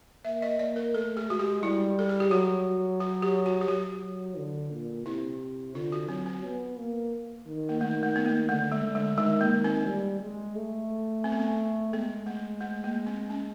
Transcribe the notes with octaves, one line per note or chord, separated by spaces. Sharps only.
A#3 E5
D#5
A#3 D5
A#4
A3 A4
G#4
G#3 F#4
G4
G3 E4
A4
G#4
G4
F#3 F#4
F#4
G4
F#4
G4
F#3 F#4
D3
A#2
C3 E4
D3 F4
F#4
F#3 C4
C4
B3
A#3
D#3
A#3
D#3 A3
A3
B3
A#3
D3 A3
G#3
D3
G#3
D#3 G#3
A#3
D#3
C4
G3
G#3
A3
C4
B3
C4
G#3 B3
A3
A3
A#3
C4
C#4